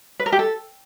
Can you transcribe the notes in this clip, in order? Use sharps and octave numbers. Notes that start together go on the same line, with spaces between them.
B4
A#4
G4
A4